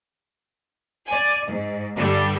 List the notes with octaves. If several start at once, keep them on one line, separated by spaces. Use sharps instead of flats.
D5 G#5
G#2
G2 D3 G3